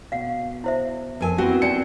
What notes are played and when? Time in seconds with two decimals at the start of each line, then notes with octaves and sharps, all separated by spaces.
0.12 B2 F5 F#5
0.64 E4 C5 E5
1.21 F2 A#4 B4 G#5
1.38 B3 C4 E4 F#4
1.62 C4 D#4 D5 C#7